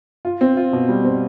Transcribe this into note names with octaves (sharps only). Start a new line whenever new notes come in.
F4
C4
F4
B2
G3
C4